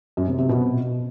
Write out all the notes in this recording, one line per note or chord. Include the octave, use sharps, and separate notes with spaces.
F#2
C3
C3
B2